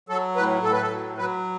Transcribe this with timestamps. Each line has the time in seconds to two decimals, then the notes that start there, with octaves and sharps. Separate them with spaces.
0.09 F#3 A4
0.36 A2 B4
0.63 A2 A4
0.73 B4
0.82 A4
0.90 F#3
1.18 F#3 B4